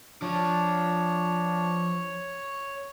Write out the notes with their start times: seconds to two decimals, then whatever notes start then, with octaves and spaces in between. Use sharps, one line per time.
0.22 F3 D4 C#5